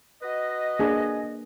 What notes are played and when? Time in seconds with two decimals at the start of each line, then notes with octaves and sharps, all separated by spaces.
0.22 F#4 B4 D#5
0.79 A#3 D4 G#4